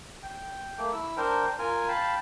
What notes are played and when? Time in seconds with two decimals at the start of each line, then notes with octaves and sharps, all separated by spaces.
0.23 G5
0.78 A3 A#3
0.93 E4 E6
1.17 D4 A#4 C5 G5
1.59 F4 A#4 G#5
1.88 F5 G5 A5 B5